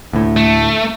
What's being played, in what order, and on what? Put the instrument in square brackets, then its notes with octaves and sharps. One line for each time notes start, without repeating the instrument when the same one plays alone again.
[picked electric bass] D2 A2
[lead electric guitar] A3